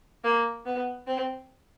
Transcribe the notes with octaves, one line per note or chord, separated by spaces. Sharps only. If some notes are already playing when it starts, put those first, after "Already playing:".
A#3
B3
C4